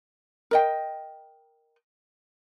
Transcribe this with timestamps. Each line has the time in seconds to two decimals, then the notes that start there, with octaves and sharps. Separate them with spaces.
0.51 A#4 D#5 G5